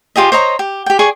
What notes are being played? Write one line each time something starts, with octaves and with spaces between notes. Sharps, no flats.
F4 G4 G#4 D#5
C5 C#5 D#5 A#5
G4
G4 G5
G#4 D5 C#6